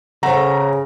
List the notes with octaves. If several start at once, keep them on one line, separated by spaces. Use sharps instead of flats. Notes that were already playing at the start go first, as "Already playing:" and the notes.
C#3 A3 C5 F#5 A#5